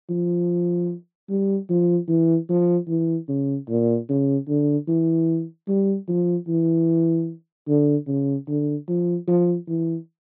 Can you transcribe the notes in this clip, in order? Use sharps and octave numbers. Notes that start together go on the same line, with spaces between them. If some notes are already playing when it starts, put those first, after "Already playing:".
F3
G3
F3
E3
F3
E3
C#3
A#2
C#3
D3
E3
G3
F3
E3
D3
C#3
D3
F3
F3
E3